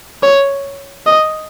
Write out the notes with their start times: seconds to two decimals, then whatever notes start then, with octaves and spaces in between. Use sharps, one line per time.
0.23 C#5
1.06 D#5